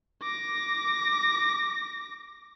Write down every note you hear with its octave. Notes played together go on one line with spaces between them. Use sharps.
D6 A#6